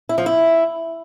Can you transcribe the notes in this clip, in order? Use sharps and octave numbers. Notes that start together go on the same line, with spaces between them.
E4
F3
E4